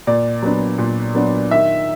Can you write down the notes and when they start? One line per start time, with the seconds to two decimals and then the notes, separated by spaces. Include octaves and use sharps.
0.07 A#2 D5
0.42 F#3 B3 D4
0.78 A#2
1.15 F#3 B3 D4
1.51 D#3 E5